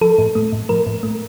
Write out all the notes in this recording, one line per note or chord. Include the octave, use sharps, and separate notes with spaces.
F3 A4
A2
A3
A2
F3 A#4
A2
A3